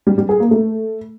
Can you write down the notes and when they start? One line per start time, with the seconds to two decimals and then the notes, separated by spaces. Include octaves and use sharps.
0.07 G3
0.18 G3
0.29 G#4
0.40 A#3
0.51 A3